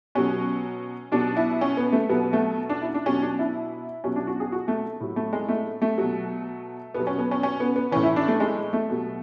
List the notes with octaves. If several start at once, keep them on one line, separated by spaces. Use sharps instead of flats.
B2 F#3 C#4
B2 F#3 D4
E4
C#4
B3
A3
B2 F#3 B3
A3
D4
E4
D4
B2 F#3 C#4
D4
E4
B2 F#3 C#4
D4
F#4
G#4
F#4
A3
A2 F#3
A3
G#3
A3
A3
B2 F#3
B2 F#3 B3
C#4
B3
C#4
C#4
B3
B3
A2 E3 C#4
E4
D4
A3
G#3
A3
B2 F#3